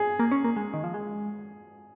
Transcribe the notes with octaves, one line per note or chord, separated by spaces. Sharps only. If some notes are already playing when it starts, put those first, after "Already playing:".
Already playing: G#4
A#3
C#4
A#3
G#3
D#3
F3
G#3